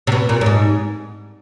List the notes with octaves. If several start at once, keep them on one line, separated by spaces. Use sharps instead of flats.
C3
B2
A#2
G2
G#2